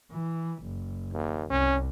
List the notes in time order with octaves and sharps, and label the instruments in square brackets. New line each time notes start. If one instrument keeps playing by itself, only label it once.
[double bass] E3
F#1
[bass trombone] D#2
[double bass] C2 [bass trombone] C#4